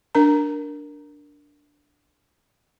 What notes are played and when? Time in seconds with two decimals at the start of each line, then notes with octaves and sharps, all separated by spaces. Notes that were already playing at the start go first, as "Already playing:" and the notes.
0.15 D4 A#4 A#5